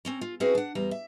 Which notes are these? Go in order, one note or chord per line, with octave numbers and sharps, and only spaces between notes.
C4 C#4 A#5
F4
C4 C#4 E4 F#4 G#4 B4
D4 F#5
E2 G3 A#5
E5